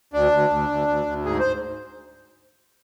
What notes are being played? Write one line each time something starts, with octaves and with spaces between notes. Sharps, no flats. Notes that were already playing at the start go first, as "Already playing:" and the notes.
D2 D4
D2
D2
D2
D2
D2
G#2 G#4
C5